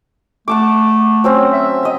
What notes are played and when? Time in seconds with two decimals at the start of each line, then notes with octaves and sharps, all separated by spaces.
0.48 A3 F#5 A5 D6
1.24 F#3 C4 C#4
1.53 E5
1.83 D#5 A#5